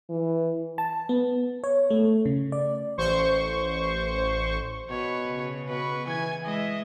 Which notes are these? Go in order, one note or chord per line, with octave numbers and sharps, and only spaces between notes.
E3
A5
B3
C#5
A3
C#3
D5
A1 C5 C#6
B2 B4 C#5
C#3
B2 B4 C#6
E3 G#5 G#6
G#3 D#5 E5